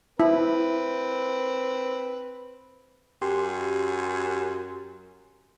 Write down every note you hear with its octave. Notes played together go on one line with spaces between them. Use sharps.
C4 E4 B4
F#2 G4 C6